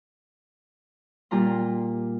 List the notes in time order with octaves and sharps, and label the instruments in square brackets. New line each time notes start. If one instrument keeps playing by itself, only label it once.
[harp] A#2 G3 F4 A#5 C6